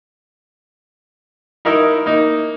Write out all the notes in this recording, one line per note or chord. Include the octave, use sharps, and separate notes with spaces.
D#4 E4 A#4 D#5
A#3 D#4